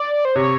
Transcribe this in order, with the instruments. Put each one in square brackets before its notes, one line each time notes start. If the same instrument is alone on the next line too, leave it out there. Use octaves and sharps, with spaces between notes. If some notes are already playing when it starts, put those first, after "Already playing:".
Already playing: [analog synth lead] D5
C5
[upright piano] C3 [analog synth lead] C#5